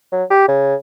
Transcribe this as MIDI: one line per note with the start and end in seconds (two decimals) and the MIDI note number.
0.12 0.24 54
0.30 0.47 67
0.48 0.75 49